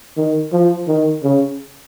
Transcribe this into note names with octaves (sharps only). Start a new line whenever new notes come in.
D#3
F3
D#3
C#3